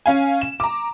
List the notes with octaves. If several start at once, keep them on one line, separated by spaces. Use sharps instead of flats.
C#4 F5 G#5
E7
A#5 D6